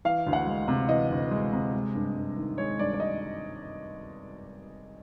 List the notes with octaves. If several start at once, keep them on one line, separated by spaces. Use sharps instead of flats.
E3 F5
D2
F#5
G#3
C3
E3 D#5
D2
G#3
C3
G#3
G2
G2
D#3
G#3 C#5
G2 D5
D5
D#5